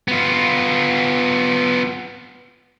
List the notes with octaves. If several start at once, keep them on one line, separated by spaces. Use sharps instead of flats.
B3 F4